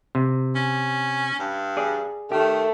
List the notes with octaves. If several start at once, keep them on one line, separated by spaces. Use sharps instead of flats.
C3
C#4
G2
G#4 D5
D#3 A3 G4